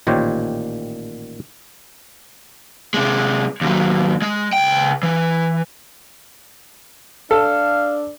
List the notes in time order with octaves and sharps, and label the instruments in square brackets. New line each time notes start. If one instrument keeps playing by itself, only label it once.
[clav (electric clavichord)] A1 A#2 D#3 G4 C5 C#5
[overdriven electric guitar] C3 G#3
D#2 F#3
G#3
C#2 G5
E3
[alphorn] D4 [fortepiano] A4 [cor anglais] F5